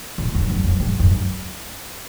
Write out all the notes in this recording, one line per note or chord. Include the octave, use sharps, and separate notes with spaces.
A2
F#2
E2
F#2
G#2
F#2